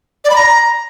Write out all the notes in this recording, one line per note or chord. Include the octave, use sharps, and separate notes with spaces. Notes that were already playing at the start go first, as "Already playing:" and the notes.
D5
B5
A#5